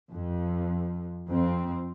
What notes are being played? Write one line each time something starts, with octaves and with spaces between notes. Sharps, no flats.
F2
F2 C4